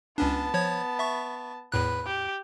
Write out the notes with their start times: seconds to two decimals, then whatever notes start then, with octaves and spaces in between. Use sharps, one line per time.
0.18 C#2 B3 C#4 D4 A5
0.54 F3 C#5 G#6
0.99 E5 C#6
1.72 E2 A2 B4 F#6
2.06 G4